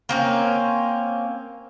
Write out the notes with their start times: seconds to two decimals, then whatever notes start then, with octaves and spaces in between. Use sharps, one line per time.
0.09 A#3 C4 C#4